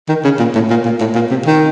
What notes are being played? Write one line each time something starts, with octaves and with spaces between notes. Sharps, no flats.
D#3
C#3
A#2
A2
A#2
A#2
A2
A#2
C3
D#3